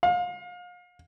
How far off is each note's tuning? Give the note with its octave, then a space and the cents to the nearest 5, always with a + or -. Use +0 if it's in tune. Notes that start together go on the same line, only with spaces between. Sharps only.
F5 +35